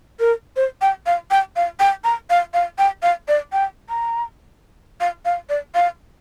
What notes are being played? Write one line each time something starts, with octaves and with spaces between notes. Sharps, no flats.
A#4
C5
G5
F5
G5
F5
G5
A#5
F5
F5
G5
F5
D5
G5
A#5
F5
F5
D5
F5